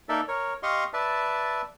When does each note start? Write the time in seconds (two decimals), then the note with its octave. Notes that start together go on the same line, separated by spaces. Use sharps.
0.09 A#3 D#4 A4 A#4 D5 E5
0.28 A#4 C#5
0.63 G4 D#5 F5 C6 C#6
0.93 B4 D5 E5 A5